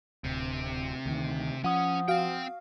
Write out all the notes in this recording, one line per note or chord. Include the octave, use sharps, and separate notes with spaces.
D1 C3
D2 D#3
F3 C#4 F#5 D#6
C4 F#4 F5 G5